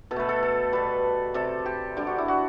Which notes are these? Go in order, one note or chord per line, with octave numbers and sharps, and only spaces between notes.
B2 A4
A3 B4
A4
A4
B2 G3 B4
C3 G3 A4
G4
D3 G3 G4
F#4
E4
F#4